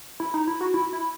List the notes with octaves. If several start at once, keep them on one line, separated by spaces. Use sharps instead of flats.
E4
D#4
E4
F#4
E4
E4